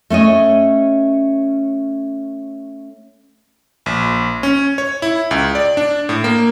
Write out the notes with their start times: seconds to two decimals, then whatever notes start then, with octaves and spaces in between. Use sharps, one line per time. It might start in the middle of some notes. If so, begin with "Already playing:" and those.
0.10 A3 C#4 C#5 D#5
3.86 A#1
4.43 C#4
4.78 C#5
5.02 E4
5.31 C#2
5.55 D5
5.77 D4
6.09 A2
6.24 A#3